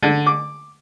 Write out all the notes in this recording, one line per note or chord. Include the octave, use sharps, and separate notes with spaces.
D3
D6